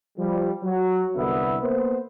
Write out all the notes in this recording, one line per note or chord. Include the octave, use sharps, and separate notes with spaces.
F3 G3
F#3
C2 D3 B3 E5
A#3 B3 C5